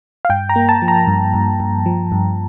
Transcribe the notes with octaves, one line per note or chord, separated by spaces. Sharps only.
F5
G2 G5
A#5
A#3
A5
F3
A#5
G2
G2
G2
F3
G2